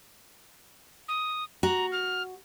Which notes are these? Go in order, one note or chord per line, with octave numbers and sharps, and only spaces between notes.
D#6
F#4 A#5
F6